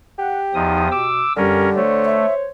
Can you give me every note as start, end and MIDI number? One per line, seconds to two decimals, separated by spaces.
0.19 1.07 67
0.19 0.42 78
0.54 0.88 40
0.54 0.88 53
0.54 0.82 63
0.54 0.88 87
0.92 1.23 47
0.92 1.33 86
0.92 1.33 88
1.37 1.68 42
1.37 2.30 50
1.37 1.79 55
1.37 1.69 61
1.37 1.69 70
1.76 2.26 57
1.76 2.47 72
1.76 2.47 73
2.05 2.34 76